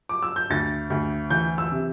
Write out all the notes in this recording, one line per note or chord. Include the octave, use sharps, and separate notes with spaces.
D6
E6
G6
D2 A6
D2
E3 G6
E6
C3